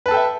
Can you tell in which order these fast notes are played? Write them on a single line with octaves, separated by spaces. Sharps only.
B4 A5 A4 G5 E5